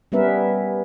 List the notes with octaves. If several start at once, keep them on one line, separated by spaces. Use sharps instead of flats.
G3 B3 C#4 A#4 B4 E5